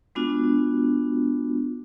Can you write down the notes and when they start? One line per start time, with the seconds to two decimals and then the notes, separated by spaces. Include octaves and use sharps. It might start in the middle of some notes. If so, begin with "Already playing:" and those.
0.15 G#3 B3 D4 F4 F#4